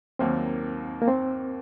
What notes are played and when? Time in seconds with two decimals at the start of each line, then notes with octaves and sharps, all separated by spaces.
0.19 D#2 D#3 F#3 A#3 C4
1.02 A#3
1.08 C4